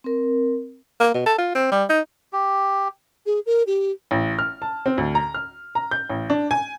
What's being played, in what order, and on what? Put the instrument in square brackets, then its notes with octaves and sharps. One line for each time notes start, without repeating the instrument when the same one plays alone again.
[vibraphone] C4 A#4
[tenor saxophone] A#3
B2
A4
F4
C4
G3
D#4
[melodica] G4
[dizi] G#4
A#4
G4
[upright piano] A1
F6
A5
C4
D2
A#5
F6
A#5
G6
A1
D4
G#5